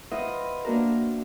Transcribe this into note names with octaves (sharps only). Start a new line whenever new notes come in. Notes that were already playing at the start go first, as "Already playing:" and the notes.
F4 B4 C5 D#5 E5 F#5
A#3 D4 F#4 A#4